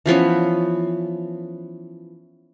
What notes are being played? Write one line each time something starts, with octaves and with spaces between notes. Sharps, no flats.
E3 F3 B3 C#4